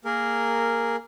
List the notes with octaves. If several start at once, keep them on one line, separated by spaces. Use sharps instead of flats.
A#3 G#4 A#4